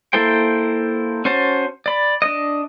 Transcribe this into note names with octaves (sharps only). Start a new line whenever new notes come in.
A#3 E4 A4 C5 G5
C#4 F#4 C5 A5
D5 B5
D4 D#5